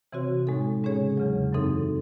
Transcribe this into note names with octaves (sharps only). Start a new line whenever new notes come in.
C3 E3 C4 F#4 C#5
A2 G#3 D#4 A4
C#3 G#3 C#4 G#4 C#5
E2 C#3 F#3
F#2 E3 C4 D#4 A4